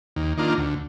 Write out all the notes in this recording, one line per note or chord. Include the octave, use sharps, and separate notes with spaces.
D#2
D#3 A#3 D4 F4
D2